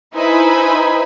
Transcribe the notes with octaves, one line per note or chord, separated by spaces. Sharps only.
D#4 E4 B4 C5 G#5 B5